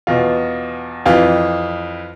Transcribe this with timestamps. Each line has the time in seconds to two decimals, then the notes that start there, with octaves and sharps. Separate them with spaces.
0.07 E2 B2 F4
1.06 F2 E3 F4